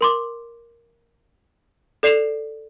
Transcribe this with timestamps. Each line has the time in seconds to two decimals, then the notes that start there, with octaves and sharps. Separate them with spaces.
0.01 A#4 C6 D6
2.03 A4 D5 C7 E7 F7